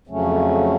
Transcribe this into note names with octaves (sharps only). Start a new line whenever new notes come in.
F2 C#3 F#3 A3 C#4